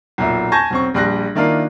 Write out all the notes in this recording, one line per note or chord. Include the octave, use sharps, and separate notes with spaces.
B1 A#2 E5
G#5 A5 C#6 G6 G#6 A#6
B1 C4 C#6
A#1 G3 C6 F#6 A#6
D#3 A#3 D4 E4 F4 A#4